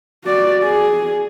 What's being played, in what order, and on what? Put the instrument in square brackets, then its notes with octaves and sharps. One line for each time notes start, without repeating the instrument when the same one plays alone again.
[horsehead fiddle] F#4 D5
G#4